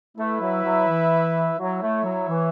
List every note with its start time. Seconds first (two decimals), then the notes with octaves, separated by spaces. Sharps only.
0.17 A3 E4 B4 E5
0.40 F#3
0.63 F#3
0.88 E3
1.58 F#3 E4 C#5 E5
1.81 A3
2.04 F#3
2.28 E3